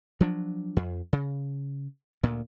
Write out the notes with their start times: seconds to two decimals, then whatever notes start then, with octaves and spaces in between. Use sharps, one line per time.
0.20 F3 F#3 D4
0.77 F2
1.13 C#3
2.23 D2 A#2